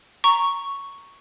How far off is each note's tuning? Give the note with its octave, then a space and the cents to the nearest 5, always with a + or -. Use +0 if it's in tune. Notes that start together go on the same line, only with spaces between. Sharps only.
A#5 +0 C#6 +0